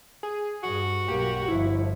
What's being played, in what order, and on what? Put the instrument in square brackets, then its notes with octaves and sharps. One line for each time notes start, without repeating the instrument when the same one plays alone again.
[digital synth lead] G#4
[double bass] G2 [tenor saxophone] F#4
[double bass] B1 A#3 [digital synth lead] G4
[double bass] G1 F3 [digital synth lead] E4